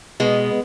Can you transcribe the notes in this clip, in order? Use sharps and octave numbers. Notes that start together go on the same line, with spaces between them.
B2 G#3 B3